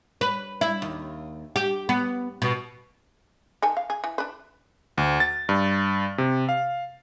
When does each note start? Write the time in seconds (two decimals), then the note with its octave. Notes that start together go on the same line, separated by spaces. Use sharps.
0.21 B4
0.61 E4
0.82 D#2
1.56 G4
1.89 B3
2.42 B2
3.62 D#3 A4 G#5
3.77 F5
3.90 G#4
4.04 E3
4.18 D4 B4
4.98 D2
5.20 A6
5.49 G2
6.18 C3
6.49 F5